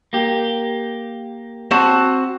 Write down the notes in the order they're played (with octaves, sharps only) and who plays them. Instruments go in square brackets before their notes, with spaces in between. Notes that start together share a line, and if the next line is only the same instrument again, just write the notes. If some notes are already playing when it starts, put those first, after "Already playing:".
[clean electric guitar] A#3 G4
[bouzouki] C4 F#4 A5